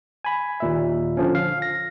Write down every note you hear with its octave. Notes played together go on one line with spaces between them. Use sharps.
G#5 B5
D#2 A#2 E5
D3 F3 C#4
F5
A#6